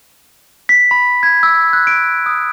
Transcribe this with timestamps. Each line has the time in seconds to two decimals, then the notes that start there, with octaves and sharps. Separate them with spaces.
0.69 B6
0.91 B5
1.23 G#6
1.43 E6
1.73 F#6
1.87 D7
2.26 D#6